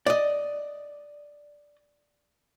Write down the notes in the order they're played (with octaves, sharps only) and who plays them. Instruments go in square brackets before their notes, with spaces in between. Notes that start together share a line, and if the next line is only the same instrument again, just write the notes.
[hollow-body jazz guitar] D5 D#5